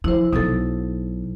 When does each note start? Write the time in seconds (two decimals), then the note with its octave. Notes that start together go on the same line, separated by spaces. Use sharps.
0.04 F3 E4 C5
0.33 B1 F#3 D#4 A4